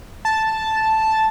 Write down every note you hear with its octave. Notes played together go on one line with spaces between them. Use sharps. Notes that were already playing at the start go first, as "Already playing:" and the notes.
A5